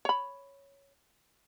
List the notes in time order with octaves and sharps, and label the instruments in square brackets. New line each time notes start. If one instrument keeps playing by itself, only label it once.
[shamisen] C#5 B5